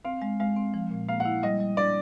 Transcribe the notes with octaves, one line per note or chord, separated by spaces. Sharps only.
C4 F5
G#3
G#3 F5
C4
F3
A#2
A#3 F5
F#5
E4
G3 D#5
G3
D4 D5